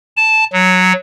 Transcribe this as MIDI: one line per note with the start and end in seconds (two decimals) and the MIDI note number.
0.17 0.45 81
0.53 0.93 54